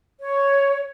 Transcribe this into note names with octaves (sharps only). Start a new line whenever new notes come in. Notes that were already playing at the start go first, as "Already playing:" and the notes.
C#5